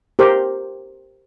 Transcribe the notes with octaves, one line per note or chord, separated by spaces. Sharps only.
G4 A#4 C5